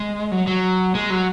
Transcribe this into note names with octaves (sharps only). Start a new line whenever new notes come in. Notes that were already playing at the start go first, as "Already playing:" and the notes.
Already playing: G#3
F#3
F#3
G#3
F#3